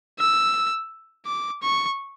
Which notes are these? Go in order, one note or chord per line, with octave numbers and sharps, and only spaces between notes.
E6
D6
C#6